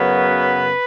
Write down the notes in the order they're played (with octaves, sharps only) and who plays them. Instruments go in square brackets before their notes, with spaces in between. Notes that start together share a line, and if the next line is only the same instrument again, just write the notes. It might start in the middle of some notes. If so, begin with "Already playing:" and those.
Already playing: [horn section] F#2 C#3 F#3 B3 B4